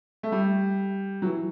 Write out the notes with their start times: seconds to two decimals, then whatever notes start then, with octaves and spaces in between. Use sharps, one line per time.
0.23 A3
0.32 G3
1.22 F#3
1.25 E3